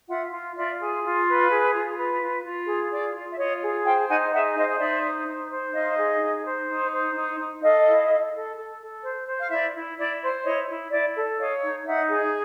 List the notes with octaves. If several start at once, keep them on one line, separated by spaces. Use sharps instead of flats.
F4 E5 F#5
F4
F4 D5 E5
G#4
F4
B4
G#4
F4
B4
F4
F4
G#4
F4 D5
F4
E5
F4 C#5 D#5
G#4
C5 F5 G5
D#4 F#5 G#5
G#4 E5 F#5
C5 D#5 F5
D#4 D5 E5
C5
D#4
C5
D#4 D#5 F5
G#4
D#4
C5
D#4
C5
D#4
D#4
A4 D#5 F5
E4
A4
A4
A4
A4
C5
C5
F5
E4 D5 E5
E4
E4 D5
C5
E4 C#5 D#5
E4
E4 D5 E5
A4
C#5 D#5 F5
D#4
D#4 E5 F#5
G#4